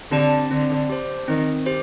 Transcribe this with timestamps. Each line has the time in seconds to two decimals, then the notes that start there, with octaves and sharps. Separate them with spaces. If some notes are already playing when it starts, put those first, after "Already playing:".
0.11 D3 C4 G4 D5 A5
0.51 D3 C4
0.90 G4 C5
1.28 D#3 C4
1.66 G4 C5